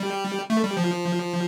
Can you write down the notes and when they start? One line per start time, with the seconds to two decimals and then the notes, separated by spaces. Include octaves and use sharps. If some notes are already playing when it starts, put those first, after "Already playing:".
Already playing: G3
0.50 A3
0.64 G3
0.77 F3